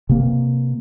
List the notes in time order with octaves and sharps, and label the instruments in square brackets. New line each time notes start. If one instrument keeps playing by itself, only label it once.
[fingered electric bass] C3 A#3